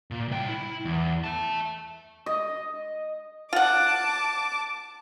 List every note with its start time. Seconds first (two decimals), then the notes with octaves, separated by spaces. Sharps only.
0.11 A#2
0.28 C2 G5
0.48 E4
0.85 E2
1.24 E5 A5
2.26 D#5
3.53 F4 F#5 A5 D6